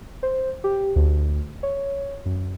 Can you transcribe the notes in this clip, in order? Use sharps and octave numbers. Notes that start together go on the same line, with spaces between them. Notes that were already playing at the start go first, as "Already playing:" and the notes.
C5
G4
D2
C#5
F#2